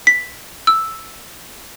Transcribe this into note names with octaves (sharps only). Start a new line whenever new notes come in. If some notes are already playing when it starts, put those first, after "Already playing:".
B6
E6